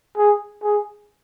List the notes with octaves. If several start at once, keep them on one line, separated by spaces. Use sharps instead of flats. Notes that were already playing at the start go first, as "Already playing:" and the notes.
G#4
G#4